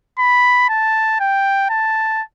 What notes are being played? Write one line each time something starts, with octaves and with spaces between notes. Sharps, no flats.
B5
A5
G5
A5